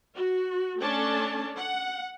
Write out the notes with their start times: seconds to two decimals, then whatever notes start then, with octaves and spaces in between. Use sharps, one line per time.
0.15 F#4
0.81 A3 C#4 D4 A4 A5
1.58 F#5